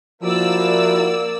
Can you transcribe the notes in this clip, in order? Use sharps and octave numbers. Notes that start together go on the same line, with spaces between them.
F3 A#3 E4 F#4 D5 E6